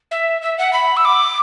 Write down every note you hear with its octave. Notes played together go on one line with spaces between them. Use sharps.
E5
E5
F#5
B5
E6
D6